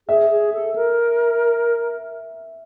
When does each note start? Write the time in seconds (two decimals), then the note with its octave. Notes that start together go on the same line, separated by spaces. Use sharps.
0.08 G#4 E5
0.30 G#4
0.54 A4
0.76 A#4